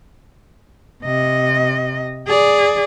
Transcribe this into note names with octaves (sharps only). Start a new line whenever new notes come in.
C3 D#5
G#4 D5